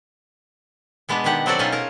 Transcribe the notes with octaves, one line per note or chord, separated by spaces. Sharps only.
B2 G#3 B3 D4
B2 D#3 D4 G4 F#5
F#3 C4 D4 F#4 A4 D5
B2 C#4 D#4 F4 D#5
G#4 A#4 A5